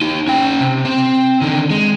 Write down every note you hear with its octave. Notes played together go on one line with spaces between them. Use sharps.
D#4 G4
C#4 G5
C3
C4
D3 D#3
G#3